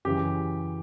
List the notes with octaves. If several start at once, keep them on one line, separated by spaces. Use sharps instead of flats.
F#2 C#3 E3 G4